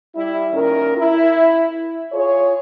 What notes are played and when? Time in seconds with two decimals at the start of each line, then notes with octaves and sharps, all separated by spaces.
0.14 G3 E4
0.51 A#2 D#3 C#4 A#4
0.97 E4
2.12 F4 G#4 C#5